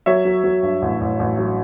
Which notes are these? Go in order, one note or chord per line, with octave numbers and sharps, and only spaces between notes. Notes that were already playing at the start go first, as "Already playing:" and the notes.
F#3 C#5 E5
F#3
F#3
G2
A1
A1
A1
F#3